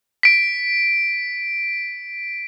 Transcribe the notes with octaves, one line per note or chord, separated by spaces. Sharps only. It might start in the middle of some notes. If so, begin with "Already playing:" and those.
B6 D7